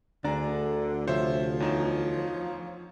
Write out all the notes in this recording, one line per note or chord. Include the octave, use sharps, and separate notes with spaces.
D2 D3 D4 G#4 D5 A#5
C3 F3 G4 C5 C#5 E5
E2 D#4 C#5 E7